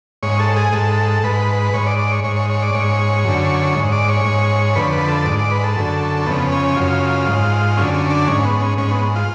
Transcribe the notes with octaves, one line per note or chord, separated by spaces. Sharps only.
G#2 C#5
A4
G#4
G#2 A4
G#2 B4
G#2 C#5
D5
D5
C#5
G#2 C#5
C#5
C#5
D5
G#2 C#5
F#2 D3
G#2
D5
C#5
G#2
F2 D3 B4
B4
A4
G#2 D5
D5
B4
A4
F#2 D3
F2 C#3 B3
C#4
F#2 C#3 F4
G#2
F#2 D3 C#4
C#4
D4
G#2 C#4
B3
C#4
G#2 C#4
B3
F4